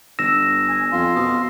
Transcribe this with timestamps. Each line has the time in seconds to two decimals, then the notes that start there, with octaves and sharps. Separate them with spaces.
0.19 G1 E6 A#6 E7
0.69 G#5
0.92 F2 F5 C6
1.16 B2 D#6